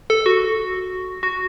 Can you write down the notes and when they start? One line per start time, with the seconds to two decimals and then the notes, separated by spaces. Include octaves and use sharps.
0.10 A4
0.26 F#4
1.23 F#4